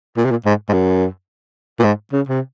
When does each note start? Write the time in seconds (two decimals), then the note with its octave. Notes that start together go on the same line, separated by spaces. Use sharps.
0.17 A#2
0.25 C3
0.31 A#2
0.45 G#2
0.69 G#2
0.73 F#2
1.79 A#2
1.84 G#2
2.13 C#3
2.28 C3